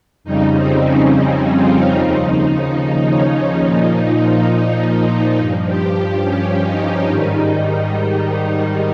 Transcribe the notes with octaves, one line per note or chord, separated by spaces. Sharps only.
F2 C#3 G3 D#4
C4
C#4
D#4
F4
D#2 C#3 F3 D#4
D#4
C#4
D#4
A#2 F3
G2 F3
G4
G4
C#4
D#4
G#2 D#3 G3